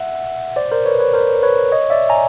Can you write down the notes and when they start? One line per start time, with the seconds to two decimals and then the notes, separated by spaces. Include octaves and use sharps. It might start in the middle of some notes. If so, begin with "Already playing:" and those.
Already playing: E5 F#5
0.56 C5 D5
0.72 A#4 C5
0.85 B4 C#5
0.99 B4 C#5
1.13 A#4 C5
1.43 B4 C#5
1.72 C#5 D#5
1.90 D5 E5
2.09 G#5 A#5